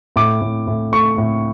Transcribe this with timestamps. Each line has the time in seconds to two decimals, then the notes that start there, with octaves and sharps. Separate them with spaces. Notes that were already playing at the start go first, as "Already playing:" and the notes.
0.16 A2 D6
0.41 A2
0.67 A2
0.92 A3 C#6
1.18 A2